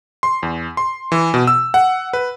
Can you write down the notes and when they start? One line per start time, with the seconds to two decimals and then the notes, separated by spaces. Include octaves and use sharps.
0.23 C6
0.43 E2
0.77 C6
1.12 E3
1.34 B2
1.47 E6
1.74 F#5
2.13 B4